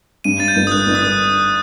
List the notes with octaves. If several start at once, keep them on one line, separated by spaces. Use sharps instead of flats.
G2 D#7
A6
G6
G1
D#6
F#6
G1
D#6